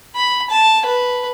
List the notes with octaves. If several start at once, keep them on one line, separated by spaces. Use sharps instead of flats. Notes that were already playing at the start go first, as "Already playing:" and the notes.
B5
A5
B4